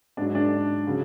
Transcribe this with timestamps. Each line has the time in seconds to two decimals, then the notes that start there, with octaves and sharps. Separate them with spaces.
0.17 G#2 F#3 D4
0.35 D4
0.87 C#3 F#3